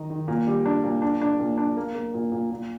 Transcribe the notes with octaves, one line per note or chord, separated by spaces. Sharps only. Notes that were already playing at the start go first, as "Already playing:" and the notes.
Already playing: D#3 D#4
D#3
A#2
G3
D4
A#2
D4
D4
A#2
D4
A#3
A#3
A#2
A#2
A#2